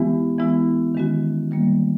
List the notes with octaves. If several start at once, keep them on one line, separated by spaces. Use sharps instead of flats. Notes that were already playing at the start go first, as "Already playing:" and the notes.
Already playing: E3 G#3 B3 E4 G4
E3 G#3 B3 E4
D#3 G#3 C#4 F#4
D#3 G3 A#3